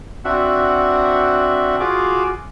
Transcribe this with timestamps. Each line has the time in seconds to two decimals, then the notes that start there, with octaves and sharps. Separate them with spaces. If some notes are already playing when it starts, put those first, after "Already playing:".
0.25 C4 D4 F#4 E5 F#5
1.80 F4 F#4 G#4 D6